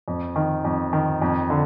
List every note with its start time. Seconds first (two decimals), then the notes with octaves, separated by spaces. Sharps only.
0.08 F2
0.36 D#3
0.65 F2
0.93 D#3
1.22 F2
1.50 D3